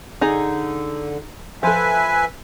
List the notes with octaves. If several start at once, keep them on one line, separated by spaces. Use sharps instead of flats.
D3 D#4 G#4 A#5
F3 A4 B4 E5 G#5